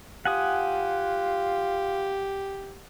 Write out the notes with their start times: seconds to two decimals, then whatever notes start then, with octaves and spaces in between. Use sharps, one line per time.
0.25 F4 G4 F#5 G#5 D#6